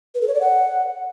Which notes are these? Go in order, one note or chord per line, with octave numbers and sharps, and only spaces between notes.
B4
A4
C#5
D5
F#5